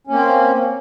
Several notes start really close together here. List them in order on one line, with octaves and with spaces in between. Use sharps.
C#4 A#3 C4